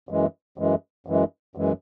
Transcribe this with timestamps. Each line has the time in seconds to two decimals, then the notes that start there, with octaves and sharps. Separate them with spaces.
0.09 F#2 E3 G#3
0.58 F#2 E3 G#3
1.06 F#2 E3 G#3
1.55 F#2 E3 G#3